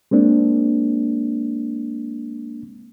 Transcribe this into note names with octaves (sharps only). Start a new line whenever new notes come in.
G#3 A#3 C4 D4